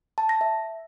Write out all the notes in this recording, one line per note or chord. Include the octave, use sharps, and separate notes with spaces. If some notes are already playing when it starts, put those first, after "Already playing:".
A5
A#6
E5